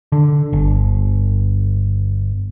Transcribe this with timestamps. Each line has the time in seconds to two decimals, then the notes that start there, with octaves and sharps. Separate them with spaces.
0.12 D3
0.53 G1